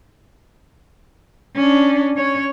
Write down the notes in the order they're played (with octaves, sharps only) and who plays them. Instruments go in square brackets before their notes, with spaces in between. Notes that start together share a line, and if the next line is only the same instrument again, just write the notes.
[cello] C#4 D4
C#4 C#5